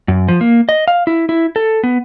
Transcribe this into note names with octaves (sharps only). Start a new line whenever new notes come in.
F#2
F3
A#3
D#5
F5
E4
E4
A4
B3